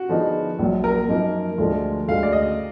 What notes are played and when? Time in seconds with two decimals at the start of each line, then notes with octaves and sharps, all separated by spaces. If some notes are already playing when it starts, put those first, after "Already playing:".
Already playing: F#4
0.09 D3 F3 B3 D#4 G#4
0.59 A#1 A#2 F#3
0.84 A#4
1.08 F#2 F3 A#3 D#4
1.58 D2 D3 F3 G#3
2.08 D2 D3 G#3 F5
2.23 D5
2.32 D#5